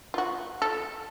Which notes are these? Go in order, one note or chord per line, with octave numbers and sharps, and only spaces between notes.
F4 F#4
A4